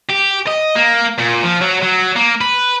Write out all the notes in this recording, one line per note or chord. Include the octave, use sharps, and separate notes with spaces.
G4
D#5
A#3
A#2
F3
F#3
F#3
A#3
B4